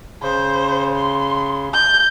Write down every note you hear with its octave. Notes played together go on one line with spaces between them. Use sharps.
C#3 C5
C6
G6